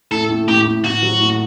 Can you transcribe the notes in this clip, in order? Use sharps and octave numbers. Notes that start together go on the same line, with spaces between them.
A2 A4
A2
A2 G4
A2
A2 F#4
F#3
A2